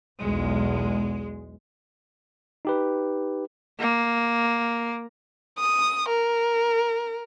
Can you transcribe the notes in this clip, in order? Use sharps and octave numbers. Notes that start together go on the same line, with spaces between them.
B1 E2 G#3
D#4 G4 B4
A#3
D#6
A#4